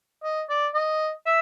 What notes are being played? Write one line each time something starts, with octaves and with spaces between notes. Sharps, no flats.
D#5
D5
D#5
E5